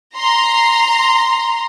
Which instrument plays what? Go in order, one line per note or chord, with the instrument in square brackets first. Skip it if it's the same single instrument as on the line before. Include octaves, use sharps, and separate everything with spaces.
[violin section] A#5 C6